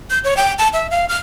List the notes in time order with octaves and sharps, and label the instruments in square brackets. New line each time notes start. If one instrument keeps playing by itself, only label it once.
[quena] G6
C#5
G5
A5
E5
F5
F6